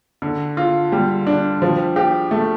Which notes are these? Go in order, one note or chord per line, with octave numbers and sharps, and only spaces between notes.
D3
F4
G3
D4
F3
G4
A3